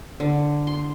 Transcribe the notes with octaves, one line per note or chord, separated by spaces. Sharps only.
D3
C6